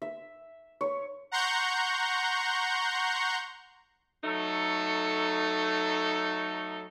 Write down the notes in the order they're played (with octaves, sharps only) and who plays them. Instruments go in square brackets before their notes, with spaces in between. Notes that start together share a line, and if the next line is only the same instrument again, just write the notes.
[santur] E5
C#5
[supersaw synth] F#5 A#5 C6 C#6 G6
[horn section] F#3 A3 D#4 A4